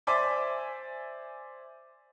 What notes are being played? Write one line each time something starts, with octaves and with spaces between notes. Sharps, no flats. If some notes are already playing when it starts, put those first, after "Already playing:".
C5 D5 E5 G#5 C6 D6